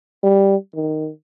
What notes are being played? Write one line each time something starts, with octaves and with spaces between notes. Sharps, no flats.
G3
D#3